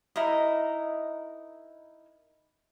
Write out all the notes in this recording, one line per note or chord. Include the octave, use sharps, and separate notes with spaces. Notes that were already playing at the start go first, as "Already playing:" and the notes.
D#4 E4 A#4 D#5